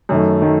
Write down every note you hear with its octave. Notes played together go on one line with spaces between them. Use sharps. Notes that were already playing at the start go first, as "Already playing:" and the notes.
F#2 D#3 A3
D#3 A3